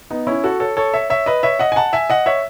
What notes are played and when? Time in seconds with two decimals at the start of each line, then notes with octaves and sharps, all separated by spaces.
0.10 B3 D#4
0.27 C#4 E4
0.44 F#4 A4
0.60 A4 C#5
0.77 A4 C#5
0.94 C#5 E5
1.10 C#5 E5
1.26 B4 D#5
1.43 C#5 E5
1.59 D#5 F#5
1.72 G#5
1.76 F#5 A5
1.93 E5 G#5
2.10 D#5 F#5
2.26 C#5 E5